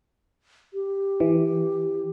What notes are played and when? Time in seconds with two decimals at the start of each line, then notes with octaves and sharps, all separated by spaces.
0.74 G4
1.20 E3